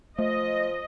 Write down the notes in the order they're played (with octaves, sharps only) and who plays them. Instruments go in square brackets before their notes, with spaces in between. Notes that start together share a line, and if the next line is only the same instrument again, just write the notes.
[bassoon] F3 [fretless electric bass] A3 [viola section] D#5